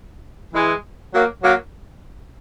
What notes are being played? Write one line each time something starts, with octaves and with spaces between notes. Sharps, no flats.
E3 G#3
F#3 A#3
F#3 A#3